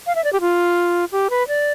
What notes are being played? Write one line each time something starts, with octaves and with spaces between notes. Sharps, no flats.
F5
E5
D5
G4
F4
G4
B4
D5